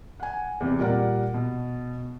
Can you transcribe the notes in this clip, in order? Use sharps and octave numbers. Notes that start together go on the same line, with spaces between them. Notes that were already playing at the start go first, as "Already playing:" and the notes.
F#5 G#5
E2 C3
A#2 G3 A#4 D5 F#5
B2